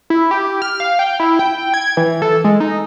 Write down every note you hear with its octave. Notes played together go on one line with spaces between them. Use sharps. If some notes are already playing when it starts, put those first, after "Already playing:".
E4
G4
F6
F5
G5
E4
G5
G#6
E3
A4
G#3
D#4